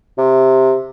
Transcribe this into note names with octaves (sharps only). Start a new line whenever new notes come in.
C3